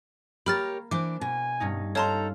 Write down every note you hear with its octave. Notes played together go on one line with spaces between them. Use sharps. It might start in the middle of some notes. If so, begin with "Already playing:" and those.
A#3 G4 A#4 C#5 B5 F6 A6
E3 D4 C5 D6
B2 G#5
G2 C#4 D#4
D#4 A4 C#5 F5 A5 A#5 C6